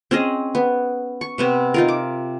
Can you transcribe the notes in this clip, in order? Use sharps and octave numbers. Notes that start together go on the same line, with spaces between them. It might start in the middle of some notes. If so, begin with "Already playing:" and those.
C4 C#4 G#4 D#5
B3
C#6
C3 B3 C4
D#4 F4 A#4
D6